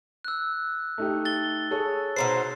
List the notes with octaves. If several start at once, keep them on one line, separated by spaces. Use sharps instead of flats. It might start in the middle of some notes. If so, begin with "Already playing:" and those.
E6 F#6
A3 D#4 G4
A6 G7
G#4 A4 C#5
B2 D#4 C5 C7